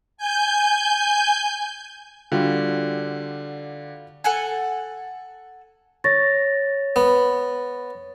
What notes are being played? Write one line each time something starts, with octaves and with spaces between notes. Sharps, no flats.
G#5 G6
D3 G3 F4 F#4
A4 F#5 G#5
C#5 A6 A#6
B3